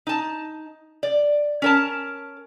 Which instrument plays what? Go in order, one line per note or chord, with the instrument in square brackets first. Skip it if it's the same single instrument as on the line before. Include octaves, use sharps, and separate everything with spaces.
[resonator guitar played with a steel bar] D#4 A5
D5
C#4 A#4 A5